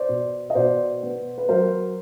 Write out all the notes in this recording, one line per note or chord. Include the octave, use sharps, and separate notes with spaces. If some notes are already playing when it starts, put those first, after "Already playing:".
Already playing: C5 D5
B2
D#5
B2 C5 D5
B3
B4
F#3 A#4 C5